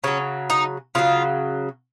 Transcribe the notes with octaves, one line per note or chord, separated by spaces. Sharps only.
C#3 F#3 C#4
D#4
C#3 F#3 F4